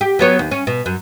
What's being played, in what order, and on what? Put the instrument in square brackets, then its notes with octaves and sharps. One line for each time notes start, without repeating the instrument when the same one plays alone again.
[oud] G4
F#3 B3 C#5
D#2
C#4
B2
F#2